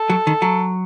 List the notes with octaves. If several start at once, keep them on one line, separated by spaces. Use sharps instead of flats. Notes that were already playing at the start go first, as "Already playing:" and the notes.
Already playing: A4
F#3
D#3
F#3